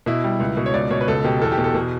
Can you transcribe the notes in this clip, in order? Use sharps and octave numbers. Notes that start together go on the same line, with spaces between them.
B2 E4
G3
C#2
B2
C#5
C#2 D5
B2 C#5
B4
C#2 A4
B2 G4
E2 A4
G4
B2
A4
B2